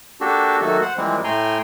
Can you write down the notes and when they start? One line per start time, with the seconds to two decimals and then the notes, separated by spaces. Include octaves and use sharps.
0.21 A#3 D4 F#4 G4 A4
0.61 D#3 F#3 A3 A#3 F#4 A4
0.82 C5 F#5
0.97 E3 F3 G3 G#3 A#3 C4
1.24 A2 A3 G5 G#5 A#5 C6